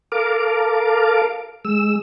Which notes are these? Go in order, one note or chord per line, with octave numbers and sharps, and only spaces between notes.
A4 A#4 F5 D6
G#3 E6